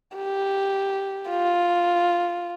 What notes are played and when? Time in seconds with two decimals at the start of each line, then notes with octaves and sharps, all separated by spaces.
0.16 G4
1.29 F4